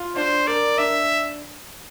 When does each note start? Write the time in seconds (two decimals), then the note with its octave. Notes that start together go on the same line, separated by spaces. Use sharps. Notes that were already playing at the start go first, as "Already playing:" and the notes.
Already playing: F4
0.16 D4 C5
0.47 A#4 D5
0.78 D4 E5